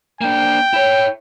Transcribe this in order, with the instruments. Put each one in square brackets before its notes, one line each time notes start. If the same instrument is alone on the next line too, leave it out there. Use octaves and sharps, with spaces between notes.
[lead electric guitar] A#3 D4 [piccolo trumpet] G5
[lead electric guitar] E4 C#5